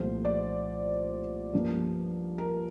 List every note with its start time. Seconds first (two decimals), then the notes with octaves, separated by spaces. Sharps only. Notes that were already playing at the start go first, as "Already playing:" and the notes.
Already playing: C2 A#2 F3 A3 C5
0.25 D5
1.53 G2 F3 A#3
2.38 A#4